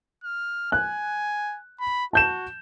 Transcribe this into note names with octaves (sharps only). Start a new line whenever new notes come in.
F6
G#5 F#6
B5
F#4 A5 G6 E7